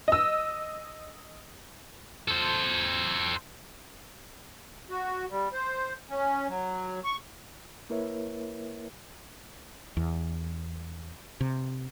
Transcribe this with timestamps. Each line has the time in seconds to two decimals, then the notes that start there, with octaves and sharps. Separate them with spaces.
0.08 D#5 E6
2.28 A4 C5
4.90 F#4
5.30 G3
5.53 C5
6.10 C#4
6.48 F#3
7.04 C#6
7.90 A#3 E4 A#4 B4 C#5 E5
9.97 E2
11.41 C3